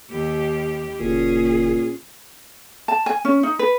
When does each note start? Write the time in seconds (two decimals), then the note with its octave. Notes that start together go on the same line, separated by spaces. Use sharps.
0.10 D#2 G4
1.00 F#1 A#2 C#4 G#4
2.88 A5
3.06 G#5
3.25 C#4
3.43 D#4
3.59 B4